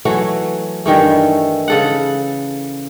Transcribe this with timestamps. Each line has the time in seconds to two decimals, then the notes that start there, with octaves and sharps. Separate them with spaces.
0.05 E3 F#3 A3
0.86 G2 D#3 E3 A3
1.68 C#3 A4 F#5